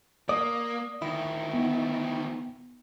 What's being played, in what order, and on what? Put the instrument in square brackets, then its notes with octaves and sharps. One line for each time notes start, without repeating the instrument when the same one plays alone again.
[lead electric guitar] A#3 [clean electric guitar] D5 [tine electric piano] D#6
[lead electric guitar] D2 D#3 [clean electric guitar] E4
[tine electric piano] B3